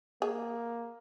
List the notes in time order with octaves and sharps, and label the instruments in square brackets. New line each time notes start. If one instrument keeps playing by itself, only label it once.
[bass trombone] A#3 [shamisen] G#4